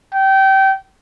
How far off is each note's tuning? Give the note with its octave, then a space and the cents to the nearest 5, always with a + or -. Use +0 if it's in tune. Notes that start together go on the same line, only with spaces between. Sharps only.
G5 -25